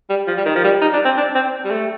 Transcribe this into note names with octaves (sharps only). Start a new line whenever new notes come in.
G3
F3
G3
D#3
F3
G3
D#4
D4
C4
D4
C4
G3
A3